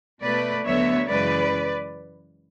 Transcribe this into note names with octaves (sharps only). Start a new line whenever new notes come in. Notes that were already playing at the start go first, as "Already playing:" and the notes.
B2 A3 B4 D5
D2 D3 F#3 B3 C#5 E5
F#2 C#3 E3 G#3 B4 D5